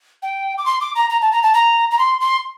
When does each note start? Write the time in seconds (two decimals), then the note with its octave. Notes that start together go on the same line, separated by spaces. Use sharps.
0.22 G5
0.58 D6
0.66 C6
0.81 D6
0.95 A#5
1.10 A#5
1.22 A5
1.32 A#5
1.43 A5
1.54 A#5
1.91 A#5
1.99 C6
2.21 C6